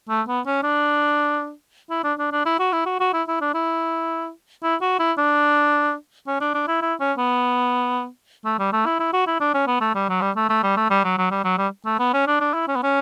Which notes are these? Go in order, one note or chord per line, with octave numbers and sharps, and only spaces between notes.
A3
B3
C#4
D4
E4
D4
D4
D4
E4
F#4
E4
F#4
F#4
E4
E4
D4
E4
E4
F#4
E4
D4
C#4
D4
D4
E4
E4
C#4
B3
A3
G3
A3
E4
E4
F#4
E4
D4
C#4
B3
A3
G3
F#3
G3
A3
A3
G3
A3
G3
F#3
F#3
G3
F#3
G3
A3
B3
C#4
D4
D4
E4
C#4
B3
C#4